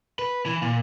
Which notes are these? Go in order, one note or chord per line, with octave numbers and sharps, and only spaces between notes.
B4
E3
A#2